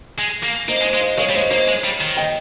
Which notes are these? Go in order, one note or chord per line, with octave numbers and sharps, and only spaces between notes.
G#3
A#3
A#3 C5 D#5
G#3
C5 D#5
G#3 F5
C5 D#5
G#3 C#5 F5
G3
G#3 C5 D#5
A#3 C5 D#5
G#3
G3
D#3
D#5 G5